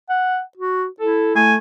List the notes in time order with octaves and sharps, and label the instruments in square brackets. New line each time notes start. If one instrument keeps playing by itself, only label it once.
[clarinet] F#5
F#4
[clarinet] E4 [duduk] A4
[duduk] A3 [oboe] G#5